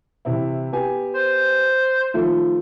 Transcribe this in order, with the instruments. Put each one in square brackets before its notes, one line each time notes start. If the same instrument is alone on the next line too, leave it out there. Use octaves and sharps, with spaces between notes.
[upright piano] C3 E3 E4
B3 G4 G#5
[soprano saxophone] C5
[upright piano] D#3 F3 A3